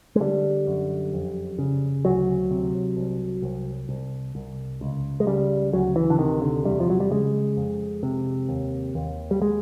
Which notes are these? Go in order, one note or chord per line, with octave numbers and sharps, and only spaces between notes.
G#3
D3 G3
F#2
F2
C#3
D2 F#3
C3
C2
C2
C2
C2
C#2
G#3
C#3 G3
D2 F#3
E3
D3
C3 D#3
D3
E2 G3
F3
F#3
G3
C#3 G#3
F2
C3
D#2
D#2
G3
G#3